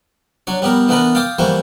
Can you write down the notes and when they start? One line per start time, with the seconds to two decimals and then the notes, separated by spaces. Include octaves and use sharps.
0.47 F#3 D4 C#5
0.62 G3 B3 G4 A#4
0.88 E3 A3 B3 D4 A#4 B4
1.15 F5 G5 A5 C6 D6 D#6
1.39 E3 G3 A3 A#3 F#4 C5